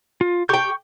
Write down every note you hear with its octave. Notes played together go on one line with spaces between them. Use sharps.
F4
G4 G5 C#6 G6